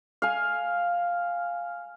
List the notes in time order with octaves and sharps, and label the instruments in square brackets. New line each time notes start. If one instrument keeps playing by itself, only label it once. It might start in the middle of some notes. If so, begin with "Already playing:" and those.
[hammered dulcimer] F5 G#5